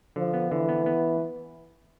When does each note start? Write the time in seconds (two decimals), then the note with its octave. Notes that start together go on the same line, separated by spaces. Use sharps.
0.16 D3 F3
0.34 B3
0.51 D3 E3
0.69 B3
0.86 B3